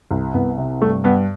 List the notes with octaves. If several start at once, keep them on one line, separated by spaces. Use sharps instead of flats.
C2
C2 B3
C3
G2 A3
G2 B3